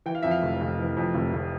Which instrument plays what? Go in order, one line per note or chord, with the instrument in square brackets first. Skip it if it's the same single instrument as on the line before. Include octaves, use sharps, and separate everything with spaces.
[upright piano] E3 G5
F5
F2 E5
F5
F1
F1
E3
F2
F1
F1